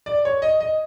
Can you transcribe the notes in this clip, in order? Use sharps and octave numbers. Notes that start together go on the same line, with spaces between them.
D5
C#5
D#5
D#5